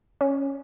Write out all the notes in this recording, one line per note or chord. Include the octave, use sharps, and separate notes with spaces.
C#4